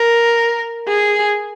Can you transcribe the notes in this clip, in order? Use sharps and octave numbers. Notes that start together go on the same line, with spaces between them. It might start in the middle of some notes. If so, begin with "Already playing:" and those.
Already playing: A#4
G#4